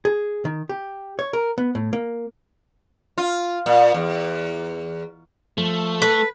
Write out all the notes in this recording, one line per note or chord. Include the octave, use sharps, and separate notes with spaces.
G#4
D#3
G4
C#5
A#4
B3
A2
A#3
F4
A#2
E2
F3 A3
A4 B4